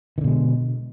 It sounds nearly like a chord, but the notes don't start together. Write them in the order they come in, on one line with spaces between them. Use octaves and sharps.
D#3 D3 B2 G#3